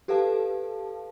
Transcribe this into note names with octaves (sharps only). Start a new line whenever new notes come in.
G4 A4 B4 F5 A5